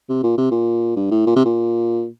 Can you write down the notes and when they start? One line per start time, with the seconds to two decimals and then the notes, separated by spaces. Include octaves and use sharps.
0.09 C3
0.23 A#2
0.38 C3
0.51 A#2
0.96 G2
1.11 A2
1.27 A#2
1.36 C3
1.45 A#2